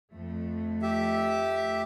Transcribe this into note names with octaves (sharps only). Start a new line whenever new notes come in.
F2 A3
G4 E5